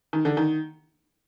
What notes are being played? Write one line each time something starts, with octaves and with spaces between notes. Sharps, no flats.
D#3
D3
D#3